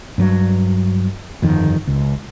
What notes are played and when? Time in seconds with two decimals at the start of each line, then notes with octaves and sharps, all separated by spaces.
0.18 G2 F#3
1.42 G1 F2 D#3
1.87 C#2